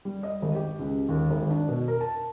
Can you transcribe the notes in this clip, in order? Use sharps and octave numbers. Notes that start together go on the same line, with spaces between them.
G3
D#5
G#1
G4
C#2
D#2
G#1
D4
B2
A#4
A5